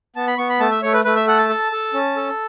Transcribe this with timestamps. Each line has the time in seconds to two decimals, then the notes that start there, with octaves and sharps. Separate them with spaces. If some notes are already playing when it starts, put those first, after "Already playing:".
0.16 B3 A5
0.27 B5
0.38 B3 C#6
0.49 B5
0.60 A3 A5
0.71 E5
0.83 A3 C#5
0.93 B4
1.04 A3 B4
1.16 E5
1.27 A4 F#5
1.38 A5
1.49 A4
1.72 A4
1.93 C#4
2.17 A4